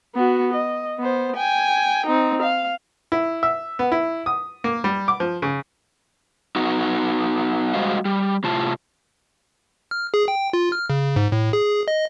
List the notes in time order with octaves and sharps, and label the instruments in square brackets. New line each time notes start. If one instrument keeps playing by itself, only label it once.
[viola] B3 F#4
D#5
B3 C5
G5 G#5
C4 D#4
F5
[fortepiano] E4
E5
B3
E4
D#6
A#3
G3
D6
F3
C#3
[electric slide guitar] B3 D#4 F#4
G3 G#3 F#4 C5 D#5 F5
G3
A2 C3 F4 A5
[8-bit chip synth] F6
G#4
G5
F4
F6
C#3
G#2
A2
G#4
D#5